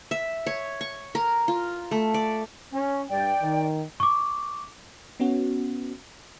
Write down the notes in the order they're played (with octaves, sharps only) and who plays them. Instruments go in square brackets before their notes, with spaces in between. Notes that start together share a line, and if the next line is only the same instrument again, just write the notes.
[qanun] E5
C#5
C#6
A#4
F4
A3
D5
[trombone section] C#4
[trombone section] G2 [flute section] D5 G5
[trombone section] D#3
[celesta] C#6 D6
[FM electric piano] B3 C#4 F#4